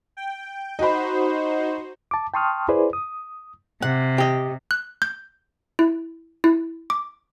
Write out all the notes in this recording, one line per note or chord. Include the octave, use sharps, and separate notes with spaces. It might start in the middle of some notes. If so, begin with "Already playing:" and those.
G5
D#4 F#4 C5 D#5 B5
A5 D6
G5 A5 C6 C#6 D#6 F6
E4 G#4 B4 C5 D5
D#6
C3 F#5
G4 D#5
F#6
G6
E4
E4
D6